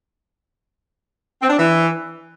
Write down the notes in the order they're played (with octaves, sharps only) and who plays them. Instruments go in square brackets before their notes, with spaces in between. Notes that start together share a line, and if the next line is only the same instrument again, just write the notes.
[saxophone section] C4
D4
E3